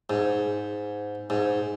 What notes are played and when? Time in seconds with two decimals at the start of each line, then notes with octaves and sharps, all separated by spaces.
0.10 G#2
1.30 G#2